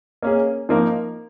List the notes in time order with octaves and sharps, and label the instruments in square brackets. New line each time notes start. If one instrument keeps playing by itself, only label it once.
[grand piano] A#3 C#4 G#4
F3 A#3 D#4 A#4